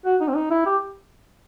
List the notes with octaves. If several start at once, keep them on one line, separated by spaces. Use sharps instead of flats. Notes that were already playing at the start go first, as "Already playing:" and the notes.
F#4
D#4
C4
D#4
E4
G4